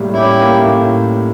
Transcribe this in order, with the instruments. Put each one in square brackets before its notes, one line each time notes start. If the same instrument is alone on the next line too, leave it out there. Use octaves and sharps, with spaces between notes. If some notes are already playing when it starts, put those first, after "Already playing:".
Already playing: [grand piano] A2 G3 A#3
[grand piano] C#4 [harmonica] E4 G4
[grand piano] A#3
A2